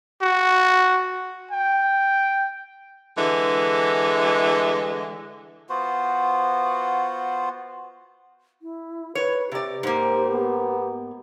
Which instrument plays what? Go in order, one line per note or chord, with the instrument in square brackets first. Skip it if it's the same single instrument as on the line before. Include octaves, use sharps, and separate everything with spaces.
[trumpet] F#4
G5
[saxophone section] D3 E3 G#3
[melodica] B3 F4 F#4 C5
[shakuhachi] E4
[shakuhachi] B4 [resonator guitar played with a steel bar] C#5
[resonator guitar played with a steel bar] C3 D5 [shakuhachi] G4
[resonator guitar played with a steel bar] G#2 A#3 [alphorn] C5
[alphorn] B3